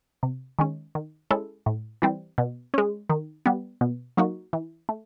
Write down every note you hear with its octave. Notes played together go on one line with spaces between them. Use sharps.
C3
D#3 G#3 C#4
D#3
G#3 C#4 E4 A4
A2
E3 G3 C4
B2
G#3 C#4
D#3
G3 B3
B2
F#3 A#3 D#4 F#4
E3
A3